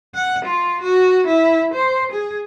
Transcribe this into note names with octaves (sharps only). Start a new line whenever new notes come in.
F#5
F4
F#4
E4
C5
G#4